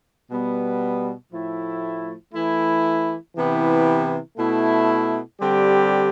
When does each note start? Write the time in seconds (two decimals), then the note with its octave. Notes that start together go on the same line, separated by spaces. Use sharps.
0.30 B2 G3 B3
1.32 A2 F3 A3 E4
2.34 E3 A3 E4
3.36 C3 E3 B3 E4 G4
4.38 B2 A3 E4
5.39 D3 G3 C4 G4